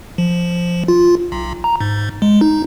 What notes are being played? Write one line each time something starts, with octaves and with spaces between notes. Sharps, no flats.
F3
F4
B1
A#5
G#2
G#3
D#4